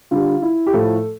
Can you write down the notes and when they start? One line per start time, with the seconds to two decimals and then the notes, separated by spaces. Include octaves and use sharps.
0.11 D3 G3 F4
0.42 E4
0.67 G4
0.73 A2 F3 A3 A4